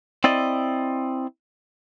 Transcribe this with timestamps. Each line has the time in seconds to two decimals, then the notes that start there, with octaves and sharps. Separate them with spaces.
0.24 C4 E4 D5 D#5